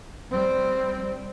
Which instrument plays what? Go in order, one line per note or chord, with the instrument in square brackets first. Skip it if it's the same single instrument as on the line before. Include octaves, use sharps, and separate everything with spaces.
[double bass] G3 C4